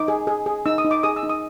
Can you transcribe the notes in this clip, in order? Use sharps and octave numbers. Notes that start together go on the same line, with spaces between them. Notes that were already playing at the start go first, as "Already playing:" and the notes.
Already playing: D#4 D6
G#4
G#4
G#4
D#4 E6
D#6
D#4
D6
G#4 D#6
E6
D#4
D#6